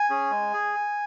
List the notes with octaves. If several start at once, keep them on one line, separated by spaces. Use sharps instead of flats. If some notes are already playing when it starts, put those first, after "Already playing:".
Already playing: G#5
C#4 G#4
G#3
G#4